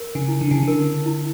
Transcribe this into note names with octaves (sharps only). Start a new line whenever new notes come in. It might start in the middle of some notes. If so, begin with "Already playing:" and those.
Already playing: A#4
C#3
E4
D3
C#3
D3 A#4
E4